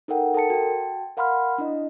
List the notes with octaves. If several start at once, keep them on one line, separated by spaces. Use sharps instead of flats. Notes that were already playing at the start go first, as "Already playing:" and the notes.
D#4 A4 A#4 F#5 G5
A4 A#4 A5 C#7
F#4 G5 A5
A#4 F5 F#5 B5 C6 F6
D4 E4 D#5